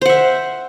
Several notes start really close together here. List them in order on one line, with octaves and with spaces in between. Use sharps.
C5 F#5 E5